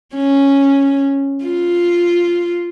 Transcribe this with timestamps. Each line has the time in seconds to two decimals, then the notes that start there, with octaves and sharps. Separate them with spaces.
0.16 C#4
1.44 F4